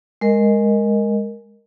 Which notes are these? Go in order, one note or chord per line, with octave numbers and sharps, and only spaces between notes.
G#3 A#4 D#5